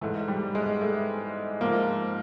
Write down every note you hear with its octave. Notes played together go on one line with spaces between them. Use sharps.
G#2 E3 A3
G3
G#3
A3
G#2 F3 A#3